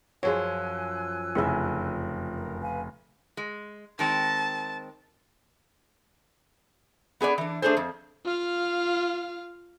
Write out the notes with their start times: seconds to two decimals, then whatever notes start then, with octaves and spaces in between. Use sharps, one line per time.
0.23 F#2 F3 G#4 C#5 G#5 E6 F#6
1.35 F1 C#3 E4 G#4 E5
2.36 A#4
2.61 B4 F5 G#5
3.37 G#3
3.99 D#3 G#3 C4 A5
7.21 B3 G#4 B4 D5
7.38 E3 D4
7.62 A3 D4 G#4 A4 C5
7.77 F2
8.25 F4 F5